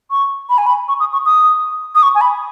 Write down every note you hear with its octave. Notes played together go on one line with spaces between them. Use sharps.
C#6
B5
G#5
B5
C#6
D#6
C#6
D#6
D#6
C#6
G#5
B5